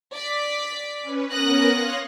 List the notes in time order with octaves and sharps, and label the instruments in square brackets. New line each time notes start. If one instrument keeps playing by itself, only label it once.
[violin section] D5 B6
[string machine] C#4 B4
[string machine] B3 C#4 A#4 [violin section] D#6 F#6 A#6
[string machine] C#5 F5 C6